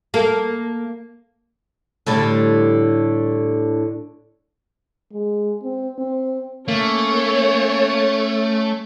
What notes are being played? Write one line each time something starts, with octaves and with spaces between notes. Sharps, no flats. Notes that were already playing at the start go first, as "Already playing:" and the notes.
A#3 A4
A2 D3 G3
G#3
C4
C4
A3 A#3 C#4 C#5